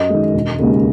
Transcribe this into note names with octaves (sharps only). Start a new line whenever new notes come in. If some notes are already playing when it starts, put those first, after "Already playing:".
Already playing: F#2 D#5
D#3 G#3
E1
D#2 C#3 G#3